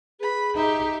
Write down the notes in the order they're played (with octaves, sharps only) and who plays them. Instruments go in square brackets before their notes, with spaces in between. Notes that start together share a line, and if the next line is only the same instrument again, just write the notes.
[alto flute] G#4 [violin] B4 B5
[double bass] D#4 [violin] G4 E5